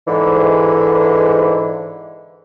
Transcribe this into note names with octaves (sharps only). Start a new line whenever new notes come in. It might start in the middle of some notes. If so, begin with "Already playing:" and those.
G#2 D3 E3